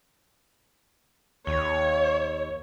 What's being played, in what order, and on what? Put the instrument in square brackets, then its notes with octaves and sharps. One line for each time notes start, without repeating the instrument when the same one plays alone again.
[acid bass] D#2 [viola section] C#5